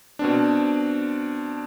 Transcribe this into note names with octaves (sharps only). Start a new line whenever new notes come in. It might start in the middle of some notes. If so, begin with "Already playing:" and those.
B2 C4 D4